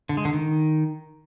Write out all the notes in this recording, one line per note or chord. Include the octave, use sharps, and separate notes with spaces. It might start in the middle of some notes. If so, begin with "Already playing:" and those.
D3
G#3
D3
D#3